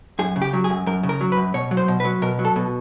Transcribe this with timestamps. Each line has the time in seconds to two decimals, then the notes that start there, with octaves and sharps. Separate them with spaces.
0.19 F#2 G#4
0.36 C#3
0.42 G4
0.53 F#3
0.64 G#4
0.69 F#2
0.86 F#2 A#4
1.03 C#3
1.09 A#4
1.21 F#3
1.32 B4
1.37 F#2
1.54 B2 C#5
1.71 F#3
1.77 C5
1.88 B2
2.00 B4
2.05 F#3
2.22 B2 A#4
2.39 F#3
2.45 A4
2.56 B2